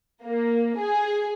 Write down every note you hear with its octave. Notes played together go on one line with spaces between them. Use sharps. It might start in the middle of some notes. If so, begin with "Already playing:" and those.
A#3
G#4